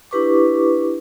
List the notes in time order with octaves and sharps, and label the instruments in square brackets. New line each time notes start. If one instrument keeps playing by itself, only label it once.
[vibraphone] D4 E4 G4 B4 C#6 D6